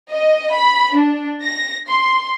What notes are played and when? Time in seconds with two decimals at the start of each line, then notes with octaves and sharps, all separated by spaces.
0.10 D#5
0.53 B5
0.95 D4
1.42 A#6
1.88 C6